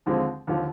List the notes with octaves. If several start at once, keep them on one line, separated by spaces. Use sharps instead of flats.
D#2 D3 F3 G#3 C4
D#2 D3 F3